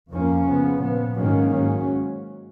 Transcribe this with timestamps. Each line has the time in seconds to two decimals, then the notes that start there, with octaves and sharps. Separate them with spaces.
0.11 F2 F3 A#3 C#4
0.47 C#3 F3 B3
0.82 A#2 F3 B3
1.18 G#2 D#3 F#3 A#3 C#4
1.54 G#2 F#3 C#4